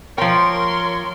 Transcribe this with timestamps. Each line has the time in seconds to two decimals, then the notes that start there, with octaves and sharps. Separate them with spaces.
0.18 F3 A#4 C#5 G5 C6